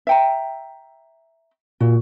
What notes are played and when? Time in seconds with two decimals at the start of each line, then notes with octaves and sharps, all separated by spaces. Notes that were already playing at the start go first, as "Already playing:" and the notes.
0.07 E5 G5 A#5
1.80 A#2 F#4